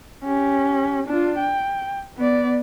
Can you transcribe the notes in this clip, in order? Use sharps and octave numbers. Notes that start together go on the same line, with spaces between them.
C#4 G4
D4 F4
G5
B3 D5